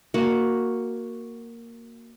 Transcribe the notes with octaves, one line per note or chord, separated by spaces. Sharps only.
A#3 F#4